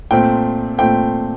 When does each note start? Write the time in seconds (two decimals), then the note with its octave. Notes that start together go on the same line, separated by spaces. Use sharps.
0.11 A#2 A3 C4 G5
0.78 A#2 A3 C4 G5